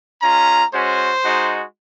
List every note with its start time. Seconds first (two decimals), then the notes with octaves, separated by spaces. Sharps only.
0.22 G#3 C#4 F4 A#5
0.72 G#3 C#4 F#4 C5
1.23 G#3 D#4 F#4